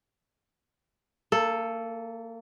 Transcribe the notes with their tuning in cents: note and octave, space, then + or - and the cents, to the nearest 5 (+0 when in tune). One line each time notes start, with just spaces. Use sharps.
A#3 -30 A4 +0